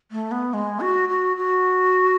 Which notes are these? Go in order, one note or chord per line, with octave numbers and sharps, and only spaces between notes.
A3
B3
G#3
F#4
F#4
F#4